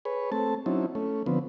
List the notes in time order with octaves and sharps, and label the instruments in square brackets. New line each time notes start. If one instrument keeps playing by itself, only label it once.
[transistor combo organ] G#4 B4 C#5
A3 C4 A5
F#3 C4 C#4 D#4 E4
A3 C#4
D3 F3 B3 C4